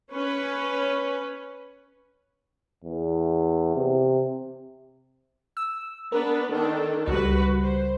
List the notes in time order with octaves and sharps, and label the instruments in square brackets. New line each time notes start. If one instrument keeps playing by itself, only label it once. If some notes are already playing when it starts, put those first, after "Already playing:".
[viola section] C#4 B4
[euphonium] E2
C3
[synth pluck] E6
[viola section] B3 D4 B4 [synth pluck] A#4
[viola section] D#3 D4 A4
[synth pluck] C#2 G3 [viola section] F#4 B4
[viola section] C5